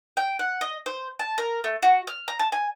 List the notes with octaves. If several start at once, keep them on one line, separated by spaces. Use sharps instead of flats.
G5
F#5
D#5
C5
A5
A#4
A3
F#4
F6
A#5
A5
G#5